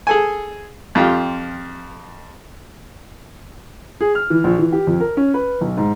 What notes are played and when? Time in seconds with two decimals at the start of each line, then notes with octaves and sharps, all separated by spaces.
0.07 G#4 A4 G#5
0.95 F2 F4 G4
4.01 G#4
4.15 F6
4.30 E3
4.44 A#1
4.58 E3
4.72 G4
4.87 F2
5.00 A#4
5.17 C#4
5.34 B4
5.61 B1
5.77 G#2